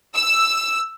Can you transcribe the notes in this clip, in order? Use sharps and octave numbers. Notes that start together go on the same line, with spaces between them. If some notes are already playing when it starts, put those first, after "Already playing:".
E6